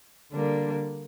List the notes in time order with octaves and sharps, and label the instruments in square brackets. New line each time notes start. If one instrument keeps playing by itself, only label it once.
[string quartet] D3 G3 A#3 D4